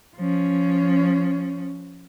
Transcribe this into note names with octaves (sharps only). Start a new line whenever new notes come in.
F3 C#4